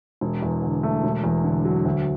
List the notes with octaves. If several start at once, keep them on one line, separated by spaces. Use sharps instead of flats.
E1
E2
D3
A3
E1
E2
D3
F#3
D2